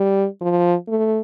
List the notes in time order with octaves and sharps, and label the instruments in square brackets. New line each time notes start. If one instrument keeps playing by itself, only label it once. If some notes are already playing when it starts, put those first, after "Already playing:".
Already playing: [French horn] G3
F3
A3